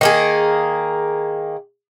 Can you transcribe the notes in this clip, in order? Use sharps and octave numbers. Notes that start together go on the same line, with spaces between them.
D#3 A#3 G#4